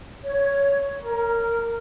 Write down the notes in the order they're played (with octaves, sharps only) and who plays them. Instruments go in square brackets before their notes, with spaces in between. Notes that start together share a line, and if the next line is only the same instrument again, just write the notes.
[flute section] C#5
A#4